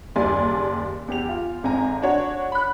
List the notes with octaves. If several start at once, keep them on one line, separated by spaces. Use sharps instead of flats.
F#1 D#2 G3 D5 G#5 C6
E2 G4 F7
F4
G#1 F2 G#5 A#5
D4 F#4 C#5
B5 F#6